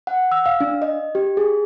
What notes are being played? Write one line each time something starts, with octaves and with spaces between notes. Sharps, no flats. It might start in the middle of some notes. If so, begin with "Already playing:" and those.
F#5
E6
F5
D4
D#5
G4
G#4